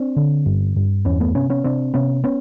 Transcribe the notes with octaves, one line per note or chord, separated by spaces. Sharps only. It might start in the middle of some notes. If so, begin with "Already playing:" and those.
Already playing: C4 D4
D3
G2
G2
E2 B3 C#4
A3 B3
C3 B3 C#4
B3 C#4
C3 C4 D4
C3 B3 C#4
B3 C#4